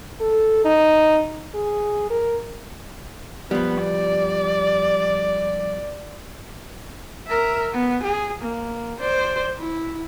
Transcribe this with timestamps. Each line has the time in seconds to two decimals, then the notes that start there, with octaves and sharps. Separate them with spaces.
0.20 A4
0.65 D#4
1.54 G#4
2.10 A#4
3.51 F3 G3 B3
3.84 D5
7.28 A#4 E5
7.73 B3
8.04 G#4
8.42 A#3
9.00 C5 D5
9.59 E4